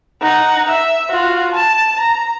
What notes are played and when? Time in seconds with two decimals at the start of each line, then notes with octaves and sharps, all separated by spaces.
0.21 D#4 F#5
0.68 E5
1.10 F4 F#4
1.52 A5
2.00 A#5